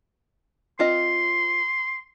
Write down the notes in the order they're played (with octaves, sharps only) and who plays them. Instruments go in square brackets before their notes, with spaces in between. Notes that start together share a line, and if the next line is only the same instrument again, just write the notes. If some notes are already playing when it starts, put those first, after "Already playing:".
[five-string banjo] C4 F4 D#5 [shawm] C6